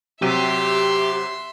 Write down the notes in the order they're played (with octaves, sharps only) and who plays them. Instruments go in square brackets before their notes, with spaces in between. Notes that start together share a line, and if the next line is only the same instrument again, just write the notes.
[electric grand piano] C3 F#3 D#7 [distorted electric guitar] G4 [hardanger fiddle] E5 C6